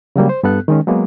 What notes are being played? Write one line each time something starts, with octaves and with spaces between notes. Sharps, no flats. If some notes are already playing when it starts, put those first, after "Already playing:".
C#3 F#3 G3 A#3
C5
G2 B3 A4 F#6
D#3 G#3 C#4
F#3 G#3 A#3 B3